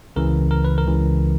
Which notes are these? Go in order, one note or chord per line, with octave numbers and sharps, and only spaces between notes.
C#2 C#3 E3 A#4
A#4
B4
A#4
C#2 C#3 E3